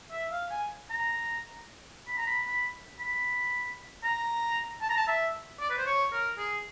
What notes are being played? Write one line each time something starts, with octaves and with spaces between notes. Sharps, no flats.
E5
F5
G#5
A#5
B5
A#5
B5
B5
B5
A#5
A5
A#5
A5
E5
D5
B4
C5
C#5
A#4
G#4